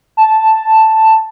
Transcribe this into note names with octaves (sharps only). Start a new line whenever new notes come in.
A5